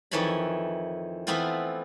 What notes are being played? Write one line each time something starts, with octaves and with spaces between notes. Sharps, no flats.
F2 D#3 E3 C#5 A5 B5
E3 A3 B3 C4 E4 F4